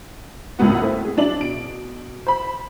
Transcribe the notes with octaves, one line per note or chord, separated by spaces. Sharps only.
G#1 C#2 A2 A#3 B3 F#4
A3 C4 E4
G#4
F#3 D4 D5 F#7
B2 D7
C5 B5